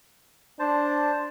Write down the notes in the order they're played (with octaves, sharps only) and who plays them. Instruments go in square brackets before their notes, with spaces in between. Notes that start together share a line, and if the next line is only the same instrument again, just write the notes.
[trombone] D4 [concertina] C5 A5